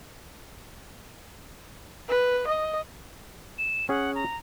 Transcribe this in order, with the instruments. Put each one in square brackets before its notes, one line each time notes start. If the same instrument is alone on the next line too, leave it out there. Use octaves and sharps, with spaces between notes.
[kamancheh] B4
D#5
[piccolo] E7
[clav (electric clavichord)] C#4 G#4 [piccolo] F#5
[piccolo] A#5